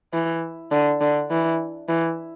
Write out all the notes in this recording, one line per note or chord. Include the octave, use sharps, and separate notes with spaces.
E3
D3
D3
E3
E3